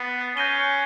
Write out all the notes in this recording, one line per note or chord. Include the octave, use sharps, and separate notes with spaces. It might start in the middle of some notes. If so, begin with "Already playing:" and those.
Already playing: B3 F#6 A6 C7
C#4 G6 A#6 D#7 G7